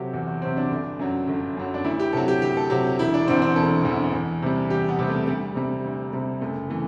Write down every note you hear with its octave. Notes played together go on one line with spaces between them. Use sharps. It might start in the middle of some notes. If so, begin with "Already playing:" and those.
Already playing: C3 F#3 G4 A4
E2 F#4
F#4
C3 F#3 C4
D4
G1
F#2 F#3
G1
F#2 F#3
D4
D2 E4
G4
C3 F#3 A4
G4
D2 G4
A4
C3 F#3 G4
E1 E4
D4
E2 D3 C4
C4
E1 A4
E2 D3
E2
C3 G3
E2 G4
B3
C3 G3
A3
D2 G3
C3 G3
D2
C3 G3
F#1 A3
E3 A3